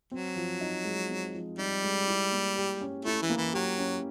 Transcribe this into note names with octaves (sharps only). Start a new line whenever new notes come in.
F#3 C4
F3
D#4
G#3
C4
F3
G3 D#4
G#3
E4
A#3
G4
C#4
A3 E4
E3
A#3
E3
F#3 G4
C#4